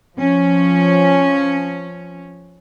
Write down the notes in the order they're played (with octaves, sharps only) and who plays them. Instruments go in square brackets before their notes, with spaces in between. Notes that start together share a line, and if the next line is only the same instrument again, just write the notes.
[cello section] F3 C#4